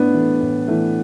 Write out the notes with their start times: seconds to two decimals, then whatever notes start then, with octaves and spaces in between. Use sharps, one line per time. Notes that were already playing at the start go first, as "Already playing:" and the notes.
Already playing: A2 B3 D4
0.14 E3 A3
0.41 A2
0.68 E3 A3